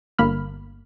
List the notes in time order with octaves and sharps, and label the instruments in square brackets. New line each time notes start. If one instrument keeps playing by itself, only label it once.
[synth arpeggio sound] G1 A#3 B5 F6